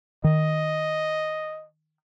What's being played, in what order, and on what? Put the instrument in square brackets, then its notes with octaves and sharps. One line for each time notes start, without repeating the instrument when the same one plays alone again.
[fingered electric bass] D#3 [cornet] D#5